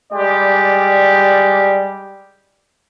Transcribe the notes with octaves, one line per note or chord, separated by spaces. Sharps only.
G3 G#3 G4 D5